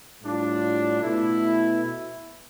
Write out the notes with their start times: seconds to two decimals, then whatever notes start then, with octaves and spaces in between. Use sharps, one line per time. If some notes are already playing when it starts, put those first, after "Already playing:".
0.22 A2 G3 D4 F4
1.01 B2 A3 E4